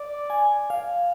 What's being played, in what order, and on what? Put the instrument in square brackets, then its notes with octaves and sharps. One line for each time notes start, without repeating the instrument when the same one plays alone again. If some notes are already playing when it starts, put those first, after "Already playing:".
Already playing: [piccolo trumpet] D5
[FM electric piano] G#5
F5